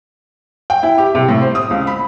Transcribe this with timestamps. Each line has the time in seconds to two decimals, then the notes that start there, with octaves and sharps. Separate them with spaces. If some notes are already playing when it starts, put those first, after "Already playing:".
0.70 G5
0.83 E4
0.98 G4
1.15 C3
1.29 A2
1.42 C5
1.55 D#6
1.71 C#2
1.87 B5